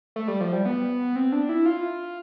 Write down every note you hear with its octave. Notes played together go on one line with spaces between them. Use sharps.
A3
G3
F3
G3
B3
C4
D4
E4
F4